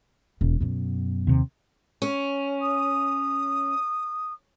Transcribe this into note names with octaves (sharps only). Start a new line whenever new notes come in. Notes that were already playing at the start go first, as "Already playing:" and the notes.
E1
F#2 B2
D#2 C3
C#4
D#6